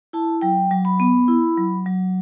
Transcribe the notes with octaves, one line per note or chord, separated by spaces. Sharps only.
E4 A5
F#3 G5
F#3
B5
B3
E4
F#3
F#3